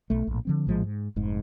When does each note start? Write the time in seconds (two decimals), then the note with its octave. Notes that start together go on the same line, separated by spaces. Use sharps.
0.10 B1 A3
0.27 A#1 A2
0.45 D3 F3 C4
0.67 A#1 A2 F3 G#3
0.83 G#2
1.16 F1 G#2